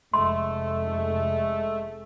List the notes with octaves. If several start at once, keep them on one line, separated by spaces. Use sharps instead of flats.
F1 G#3 A3 C6